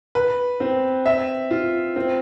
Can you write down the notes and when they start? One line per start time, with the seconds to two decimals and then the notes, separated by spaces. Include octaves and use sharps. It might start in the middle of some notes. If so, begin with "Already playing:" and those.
0.15 B4
0.60 C4
1.06 E5
1.51 F4
1.96 C4